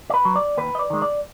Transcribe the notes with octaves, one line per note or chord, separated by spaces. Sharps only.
D5
B4
F#3
D5
D#2 B4
D#5
D5
D#3 G#3
D5